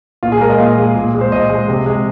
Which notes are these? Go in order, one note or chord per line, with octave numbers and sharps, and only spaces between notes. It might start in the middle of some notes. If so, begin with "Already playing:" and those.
A#2 F4
G#4
G#3 A#4
D#5
A#2 F5
G#3
A#2
G#3
C5
A#2 D#5
G#3
C3
G#3